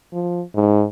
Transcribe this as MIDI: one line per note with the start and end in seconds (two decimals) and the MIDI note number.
0.13 0.42 53
0.55 0.85 44